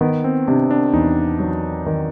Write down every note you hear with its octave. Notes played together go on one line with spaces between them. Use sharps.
D#3 B3
C4
C3 D4
D4
E2 D#4
F#3
D#3